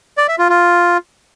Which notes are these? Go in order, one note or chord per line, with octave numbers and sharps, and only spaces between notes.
D5
E5
F4
F4